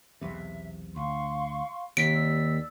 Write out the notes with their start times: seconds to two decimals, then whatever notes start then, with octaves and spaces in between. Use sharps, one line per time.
0.21 B1 E2 C3 E5
0.96 D2 F5 C6 C#6
1.97 D#2 C3 B6 D7
2.14 D5 E6